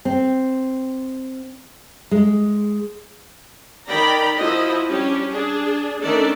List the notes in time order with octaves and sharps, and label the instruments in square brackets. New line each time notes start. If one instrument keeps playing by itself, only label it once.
[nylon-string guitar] C4
G#3
[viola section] D#3 D5 G5 A#5 B5
F3 E4 F#4 D#5
G3 C#4 D4 G4
D4 G#4
D#3 A3 C#4 D4 A4 D5